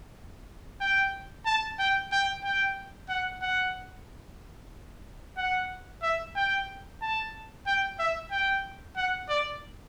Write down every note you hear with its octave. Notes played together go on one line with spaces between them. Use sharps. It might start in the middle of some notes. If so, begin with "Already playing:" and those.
G5
A5
G5
G5
G5
F#5
F#5
F#5
E5
G5
A5
G5
E5
G5
F#5
D5